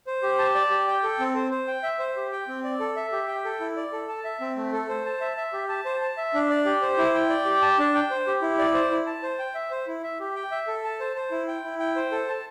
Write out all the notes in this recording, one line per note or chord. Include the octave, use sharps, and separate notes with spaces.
C5
G4
A5
D5
G4
G5
A4
C4
C5
C5
G5
E5
C5
G4
G5
C4
D5
A4
E5
G4
G5
A4
E4
D5
A4
A5
E5
C4
A3
A4
C5
A5
E5
E5
G4
A5
C5
A5
E5
D4
D5
G4
C5
E4
G5
D5
G4
A5
D4
G5
C5
G4
E4
D5
C5
E4
A5
C5
G5
E5
C5
E4
E5
G4
G5
E5
A4
A5
C5
C5
E4
G5
E4
G5
C5
A4
A5